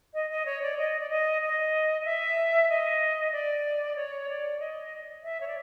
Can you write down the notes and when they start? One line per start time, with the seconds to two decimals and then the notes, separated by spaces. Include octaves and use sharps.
0.13 D#5
0.30 D#5
0.45 C#5
0.61 D5
0.77 D#5
0.99 D5
1.09 D#5
1.41 D#5
2.01 D#5
2.04 E5
2.69 D#5
3.32 D5
3.95 C#5
4.28 D5
4.59 D#5
5.23 E5
5.40 C#5
5.47 D5